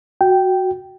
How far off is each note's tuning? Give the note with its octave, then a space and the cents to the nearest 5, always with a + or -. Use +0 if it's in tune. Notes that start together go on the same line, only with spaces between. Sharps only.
F#4 +0 G5 -10